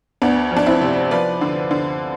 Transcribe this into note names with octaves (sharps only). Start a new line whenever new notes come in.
D2 B3 D4
F3
D4
C4 E4
C3
F3 B4 D5
D3
D3